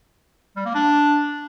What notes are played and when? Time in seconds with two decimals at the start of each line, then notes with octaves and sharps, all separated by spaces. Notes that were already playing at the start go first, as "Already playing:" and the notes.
0.56 G3
0.65 A#3
0.75 D4